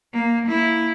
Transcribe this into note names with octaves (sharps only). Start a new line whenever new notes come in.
A#3
A#3 E4